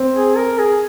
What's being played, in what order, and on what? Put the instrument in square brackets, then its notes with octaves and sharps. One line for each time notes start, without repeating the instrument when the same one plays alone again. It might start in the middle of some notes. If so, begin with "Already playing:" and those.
Already playing: [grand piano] C4
[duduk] G#4
A#4
G#4